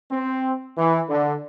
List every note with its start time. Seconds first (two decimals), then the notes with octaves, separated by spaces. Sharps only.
0.12 C4
0.78 E3
1.09 D3